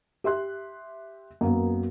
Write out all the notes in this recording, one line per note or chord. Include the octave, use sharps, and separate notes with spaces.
G4 E5 C6 F#6
F#2 A#3 B3